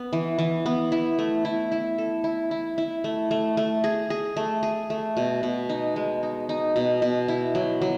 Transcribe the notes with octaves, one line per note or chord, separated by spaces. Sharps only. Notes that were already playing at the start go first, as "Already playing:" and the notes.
Already playing: B3
E3
E3
B3
E4
A3
E4
E4
A4
E4
E4
E4
A3
A3
A3
G#4
G#4
A3
G#4
A3
B2
B2
D#4
G#3
D#4
D#4
B2
B2
E4
F#3
F#3